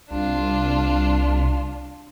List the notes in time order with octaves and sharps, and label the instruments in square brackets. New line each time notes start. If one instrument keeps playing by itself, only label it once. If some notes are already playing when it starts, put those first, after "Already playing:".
[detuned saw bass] C2 [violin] D4 F4